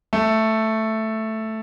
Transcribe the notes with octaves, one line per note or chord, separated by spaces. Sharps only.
A3